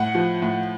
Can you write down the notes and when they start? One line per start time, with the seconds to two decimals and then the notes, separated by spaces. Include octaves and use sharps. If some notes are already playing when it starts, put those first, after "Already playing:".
Already playing: A2 F#5
0.15 F3
0.42 A2